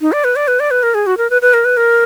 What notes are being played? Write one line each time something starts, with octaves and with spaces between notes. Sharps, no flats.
D#4
D5
B4
D5
B4
D5
B4
A#4
G#4
F#4
A#4
B4
B4
A#4
B4
A#4